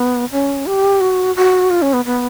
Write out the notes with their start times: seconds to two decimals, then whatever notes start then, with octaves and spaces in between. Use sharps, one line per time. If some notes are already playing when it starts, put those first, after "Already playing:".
Already playing: B3
0.32 C#4
0.66 G4
1.01 F#4
1.36 F#4
1.70 F4
1.82 C#4
1.93 B3
2.05 B3